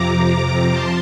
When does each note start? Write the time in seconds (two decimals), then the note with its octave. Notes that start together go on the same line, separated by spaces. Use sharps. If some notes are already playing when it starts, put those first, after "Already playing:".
Already playing: F2 C3 F3 A#5 D6
0.71 F3 A5 C6